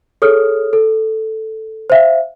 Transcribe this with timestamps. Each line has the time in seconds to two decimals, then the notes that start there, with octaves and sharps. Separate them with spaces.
0.22 G#4 A4 C#5 D#6 F6
0.73 A4
1.90 C5 E5 F5